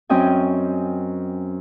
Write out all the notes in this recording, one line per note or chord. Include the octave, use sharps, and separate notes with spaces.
F#2 C4 C#4 D#5 G5 G#5